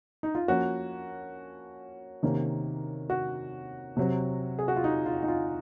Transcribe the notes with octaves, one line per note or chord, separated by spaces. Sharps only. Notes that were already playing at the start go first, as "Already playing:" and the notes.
D#4
F4
F3 A#3 C#4 F#4
C3 D#3 A#3 C#4
F#4
C3 F#3 C4
G#4
F#4
F4
D#4
F4
D#4
F4